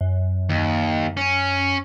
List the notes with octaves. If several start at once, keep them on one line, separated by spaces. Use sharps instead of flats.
F#2
D#2
C#4